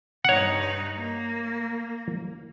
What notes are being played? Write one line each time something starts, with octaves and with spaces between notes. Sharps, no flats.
G2 D#4 C#5 F#5
A#3